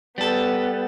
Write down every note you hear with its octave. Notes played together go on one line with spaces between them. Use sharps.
G3 B3 A4